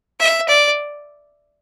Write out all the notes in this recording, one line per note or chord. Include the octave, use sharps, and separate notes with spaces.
E5
D5